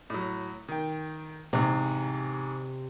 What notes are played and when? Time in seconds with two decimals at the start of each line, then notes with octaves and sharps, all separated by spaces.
0.10 A2 F#3
0.69 D#3 G5
1.53 A1 G#2 C3